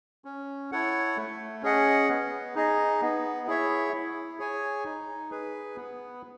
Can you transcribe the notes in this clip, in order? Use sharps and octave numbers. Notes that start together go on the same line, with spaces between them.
C#4
E4 A4 C#5 F#5
A3
C#4 G#4 D#5 F#5
B3
D#4 G#4 D#5
B3
E4 G#4 C#5 E5
E4
G#4 C#5 G#5
D#4
G#4 B4
B3